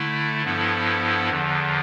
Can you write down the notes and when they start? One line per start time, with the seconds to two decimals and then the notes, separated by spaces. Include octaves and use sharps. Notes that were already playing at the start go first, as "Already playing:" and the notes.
Already playing: D3 A3 E4
0.43 G2 F3 B3 E4 A4
1.29 E2 D3 F3